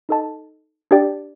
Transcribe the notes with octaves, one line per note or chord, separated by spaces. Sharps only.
D#4 A4 D#5 A5
D4 G4 D5 G5